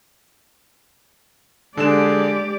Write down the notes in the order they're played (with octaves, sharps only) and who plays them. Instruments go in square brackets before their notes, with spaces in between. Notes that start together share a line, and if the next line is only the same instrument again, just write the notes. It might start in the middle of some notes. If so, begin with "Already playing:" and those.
[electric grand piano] D3 D4 E7 [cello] G#3 [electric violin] G4 D5 [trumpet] G#4